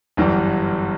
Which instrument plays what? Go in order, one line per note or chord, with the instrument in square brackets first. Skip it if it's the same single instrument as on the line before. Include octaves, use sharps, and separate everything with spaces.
[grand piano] G1 F#2 E3 G3